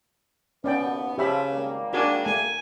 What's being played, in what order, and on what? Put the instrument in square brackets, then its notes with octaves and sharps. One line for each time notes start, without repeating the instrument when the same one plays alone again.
[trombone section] D#2 B2 [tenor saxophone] B3 [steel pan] C#4 D5 G5
[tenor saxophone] C#3 [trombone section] F3 [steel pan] G4 E5 B5
[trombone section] G#1 G3 A#3
[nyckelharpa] D4 [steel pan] F#4 A#4 G#5 [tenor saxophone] G#4
[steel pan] A3 [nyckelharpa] G#5